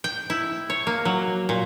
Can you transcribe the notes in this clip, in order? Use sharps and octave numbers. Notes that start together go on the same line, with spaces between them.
G5
E4
C#5
A#3
F#3
A#2